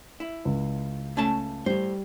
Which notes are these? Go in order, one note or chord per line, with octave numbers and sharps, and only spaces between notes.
E4
C#2
A3 C#4 A5
A2 G3 C5